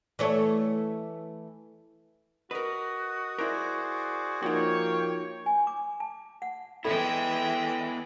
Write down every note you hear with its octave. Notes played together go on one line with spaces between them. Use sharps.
E3 A3 C#5
F#4 A#4 B4 D#5
E4 G#4 A#4 C5 D5
F3 A#3 D#4 F#4 C#5 G5
G#5
D6
A5
F#5
E3 G#3 B3 E4 A4 E5 G5 B5